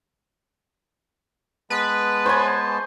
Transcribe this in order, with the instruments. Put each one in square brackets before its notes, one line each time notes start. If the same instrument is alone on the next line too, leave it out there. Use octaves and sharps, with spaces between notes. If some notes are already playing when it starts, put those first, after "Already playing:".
[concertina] G#3 B3 A5 [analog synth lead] B4
[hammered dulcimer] C5 C#5 G#5